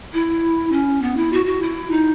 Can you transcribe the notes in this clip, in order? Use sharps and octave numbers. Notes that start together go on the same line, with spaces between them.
E4
C#4
B3
E4
F#4
F#4
E4
D#4